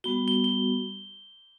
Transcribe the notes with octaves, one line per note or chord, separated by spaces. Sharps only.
G3 B3 F#4 G7
G7
G7